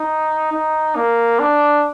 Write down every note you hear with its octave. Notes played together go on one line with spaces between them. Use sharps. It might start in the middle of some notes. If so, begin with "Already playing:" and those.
Already playing: D#4
D#4
A#3
D4